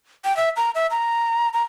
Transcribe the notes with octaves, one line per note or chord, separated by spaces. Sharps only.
G5
E5
A#5
E5
A#5
A#5